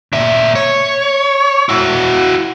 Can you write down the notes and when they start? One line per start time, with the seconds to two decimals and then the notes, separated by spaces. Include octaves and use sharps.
0.13 A#2 E5
0.55 C#5
1.69 E4 F#4